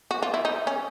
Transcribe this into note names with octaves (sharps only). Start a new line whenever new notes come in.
F#4
F4
E4
D#4
C#4